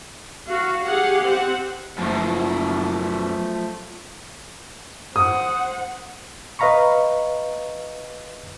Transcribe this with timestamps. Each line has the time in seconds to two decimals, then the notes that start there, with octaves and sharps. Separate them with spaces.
0.48 F#4 F5
0.85 G4 G#4 F5 F#5
1.23 C4 F#5
1.98 F#1 F#2 B2 F3 A3
5.16 C5 F#5 D#6
6.59 B4 D#5 F5 A#5 B5 C#6